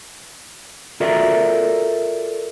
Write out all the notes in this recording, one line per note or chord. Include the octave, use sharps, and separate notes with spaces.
F4 F#4 A4 A#4 D5 E5